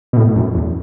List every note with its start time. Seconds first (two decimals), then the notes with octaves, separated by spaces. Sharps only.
0.13 B2
0.17 A2
0.36 F#2
0.54 E2